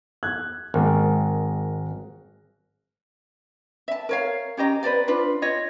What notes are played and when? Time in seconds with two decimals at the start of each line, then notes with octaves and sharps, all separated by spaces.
0.23 F#6 G#6
0.74 G#1 G#3 A#4
3.88 E5 A5
4.09 A#4 C#5 F5
4.57 C#4 G4 D#5 A#5
4.83 B4 C5 D5 F5
5.08 D4 F4 B4
5.42 F4 C#5 D#5